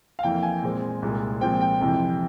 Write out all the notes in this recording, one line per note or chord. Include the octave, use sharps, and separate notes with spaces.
F5
F2 E3 A#3 G5
G#5
A#2 G#3 C4
C2 A#2 G#3
A#2 F3 G#3 C4 G5
G5
F2 C3 E3